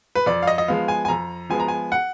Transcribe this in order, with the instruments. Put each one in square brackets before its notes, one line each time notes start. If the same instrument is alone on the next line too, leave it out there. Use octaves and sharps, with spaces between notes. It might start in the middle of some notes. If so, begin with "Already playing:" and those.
[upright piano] B4
F2 D5
F5
D#5
D#5
F3 G#3 B3 F5
G#5
G#5
F2 A#5
F3 G#3 B3 G#5
A#5
G#5
F#5